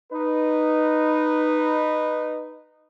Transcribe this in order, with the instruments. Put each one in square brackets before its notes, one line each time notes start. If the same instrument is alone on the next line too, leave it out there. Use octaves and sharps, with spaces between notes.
[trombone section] D#4 B4